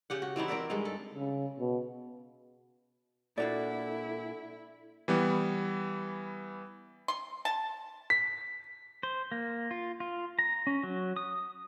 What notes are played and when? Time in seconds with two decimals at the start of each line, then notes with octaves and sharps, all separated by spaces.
0.10 C#3 G4 F#5
0.22 F#4
0.36 E3 C4 D#4 E4
0.48 C4 A#4 D5 E5
0.70 G2 G#3 D#4
0.85 A4
1.15 C#3
1.59 B2
3.38 A#2 D4 E4 F#4 A4 D5
5.08 E3 G3 B3
7.08 C6
7.45 A5
8.10 B6
9.03 C5
9.32 A#3
9.71 F4
10.00 F4
10.39 A#5
10.67 C#4
10.83 F#3
11.16 D#6